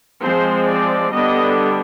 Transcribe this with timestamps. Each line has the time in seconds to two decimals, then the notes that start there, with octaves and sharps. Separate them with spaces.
0.21 F3 G#3 C4 C5
0.67 D5
1.13 D3 G3 B3 D4 D#5